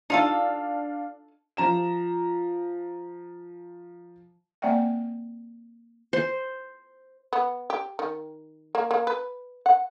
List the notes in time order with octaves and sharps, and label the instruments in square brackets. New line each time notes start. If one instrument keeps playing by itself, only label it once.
[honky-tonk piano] D4 F5 [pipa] D#4 F4 A4
[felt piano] F3 A#5 E7
[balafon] A#3 C4 D5 E5 F#5 G5
[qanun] C5
[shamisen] B3
G4
D#3
A#3
A#3
B4
F#5